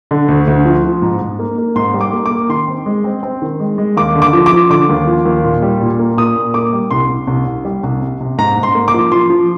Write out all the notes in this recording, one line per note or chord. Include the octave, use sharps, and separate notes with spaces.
D3
D2
D2
F3
F3
G#2
G#2
A#3
A#3
G#2 C6
G3
D6
A#3
D6
A#3
D#3 C6
C4
G#3
C4
C4
D#3
G#3
G#3
D#2 D6
D3
D6
F3
D6
F3
D3 D6
D#2
F3
D#2
A#2
G3
A#2
A#3
A#2 D#6
A#2
A#3 D6
G3
C2 C6
C2
C2
C2
G3
C2
C3
C3
G#2 A#5
G#2
C6
A#3
D6
F3
F3 C6
F3